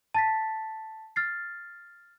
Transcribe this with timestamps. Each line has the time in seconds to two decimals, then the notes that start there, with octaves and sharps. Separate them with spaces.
0.15 A5 A6 B6
1.16 F6 A6 C7